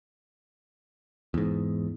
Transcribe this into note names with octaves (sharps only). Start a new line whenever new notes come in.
E2 G#2